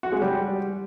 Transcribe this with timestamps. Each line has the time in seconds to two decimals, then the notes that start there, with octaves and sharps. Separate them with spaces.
0.03 F#4
0.12 G#3
0.21 G3